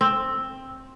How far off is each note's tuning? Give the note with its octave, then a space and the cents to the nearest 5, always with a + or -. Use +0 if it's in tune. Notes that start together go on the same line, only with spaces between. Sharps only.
C4 +10